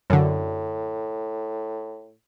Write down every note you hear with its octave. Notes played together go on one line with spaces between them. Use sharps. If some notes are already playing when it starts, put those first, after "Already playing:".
F#2 A2 D3